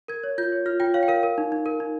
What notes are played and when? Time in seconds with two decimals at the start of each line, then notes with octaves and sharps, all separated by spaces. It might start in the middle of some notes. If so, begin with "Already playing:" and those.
0.08 A#4 G#6
0.24 C#5
0.38 F4 G6
0.52 C#5
0.66 F4 F6
0.80 F4 G5
0.94 C#5 F5
1.03 G5
1.08 A#4 F5
1.23 A#4
1.38 D#4
1.52 D#4
1.66 A#4
1.80 D#4